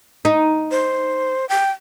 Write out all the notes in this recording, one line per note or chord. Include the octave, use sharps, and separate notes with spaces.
D#4
C5
G5